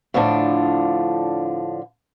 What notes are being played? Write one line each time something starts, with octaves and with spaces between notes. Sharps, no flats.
A2 D3 F3 D4 F4